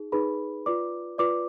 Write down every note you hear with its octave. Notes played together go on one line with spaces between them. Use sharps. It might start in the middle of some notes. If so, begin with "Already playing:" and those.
Already playing: D#4 G#4
D#4 G#4 B4 B5
F4 B4 D5 D6
F4 B4 D5 D6